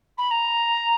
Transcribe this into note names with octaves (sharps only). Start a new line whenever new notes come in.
B5
A#5